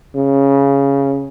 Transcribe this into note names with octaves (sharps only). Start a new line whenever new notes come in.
C#3